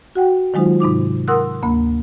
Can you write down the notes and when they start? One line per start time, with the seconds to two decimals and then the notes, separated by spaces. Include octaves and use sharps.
0.15 F#4 F#5 G5
0.54 D#3 F#3 G#3 D#4 F4 C5
0.80 G#2 C3 D#4 D6
1.28 A#4 F#5 C6 D#6 E6 F#6
1.62 D2 A#3 B5